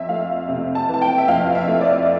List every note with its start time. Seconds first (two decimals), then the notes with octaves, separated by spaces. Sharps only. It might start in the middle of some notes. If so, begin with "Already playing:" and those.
Already playing: F2 E5
0.09 A3 F5
0.49 C3
0.75 A5
0.89 E3 A5
1.02 G5
1.18 E5
1.28 F2 F5
1.55 E5
1.68 A3
1.81 D5